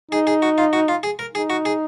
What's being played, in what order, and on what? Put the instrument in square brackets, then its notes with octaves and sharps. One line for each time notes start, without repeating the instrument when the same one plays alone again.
[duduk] D#4 [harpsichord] G#4
[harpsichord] G#4
F#4
F4
F#4
F4
G#4
A#4
[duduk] D#4 [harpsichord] G#4
[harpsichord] F#4
G#4